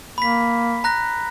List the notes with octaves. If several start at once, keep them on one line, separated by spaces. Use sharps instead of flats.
A#3 B5 B6
A#5 F#6 A#6